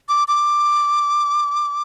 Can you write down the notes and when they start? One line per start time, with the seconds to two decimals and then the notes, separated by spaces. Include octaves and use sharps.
0.09 D6
0.28 D6